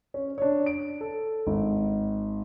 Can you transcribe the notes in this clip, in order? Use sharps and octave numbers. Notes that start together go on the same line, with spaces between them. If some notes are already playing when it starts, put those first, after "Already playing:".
C#4
D4 C#5
D7
A4
G#1